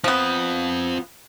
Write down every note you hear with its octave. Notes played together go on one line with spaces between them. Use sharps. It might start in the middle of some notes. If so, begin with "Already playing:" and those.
F3 B3 C4 F4